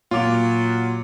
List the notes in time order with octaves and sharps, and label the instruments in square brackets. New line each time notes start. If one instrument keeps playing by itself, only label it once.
[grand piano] A#2 F7 [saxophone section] F#3 [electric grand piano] F4 D6